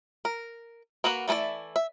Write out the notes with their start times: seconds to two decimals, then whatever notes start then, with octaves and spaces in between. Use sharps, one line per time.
0.25 A#4
1.04 A#3 F#4 B4 F#5
1.28 E3 A3 A#3 E4 D5
1.76 E5